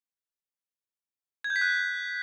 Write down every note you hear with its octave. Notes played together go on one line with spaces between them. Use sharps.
G#6
G6
B6
F#6